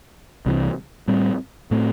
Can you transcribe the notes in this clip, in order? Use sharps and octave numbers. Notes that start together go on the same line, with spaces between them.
C2 C3 E3
A2 G3 C4
A2 A3 C4